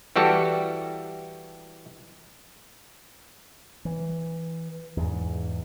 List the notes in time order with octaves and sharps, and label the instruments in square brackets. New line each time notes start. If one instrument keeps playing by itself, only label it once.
[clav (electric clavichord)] E3 G3 F#4 G4 A4
[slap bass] E3
E2 G#2